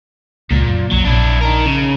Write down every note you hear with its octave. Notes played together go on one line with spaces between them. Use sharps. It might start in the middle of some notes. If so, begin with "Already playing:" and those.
C#2 A#2 G3 G#3
F#2
B1 F#3
A#1 D4 E4
D#4 A#4
C#3